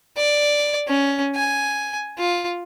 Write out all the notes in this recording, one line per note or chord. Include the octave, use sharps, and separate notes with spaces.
D5
C#4
G#5
F4